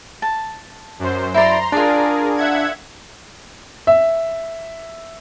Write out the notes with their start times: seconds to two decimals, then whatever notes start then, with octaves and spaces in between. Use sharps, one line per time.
0.22 A5
0.99 F#2 C5
1.34 E4 D5 A#5 C6
1.72 D4 F4 G#4 A#4 D5
2.36 E5 F#5 G#6
3.87 E5